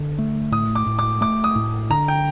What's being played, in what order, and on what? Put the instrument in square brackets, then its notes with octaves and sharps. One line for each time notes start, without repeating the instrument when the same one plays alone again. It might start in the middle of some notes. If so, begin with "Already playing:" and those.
Already playing: [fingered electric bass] D3
A3
[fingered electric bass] A2 [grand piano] D#6
[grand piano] D6
[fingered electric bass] A2
[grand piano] D6
[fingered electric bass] A3 [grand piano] D6
[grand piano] D#6
[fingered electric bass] A2
[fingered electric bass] D3 [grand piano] A#5
[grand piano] G5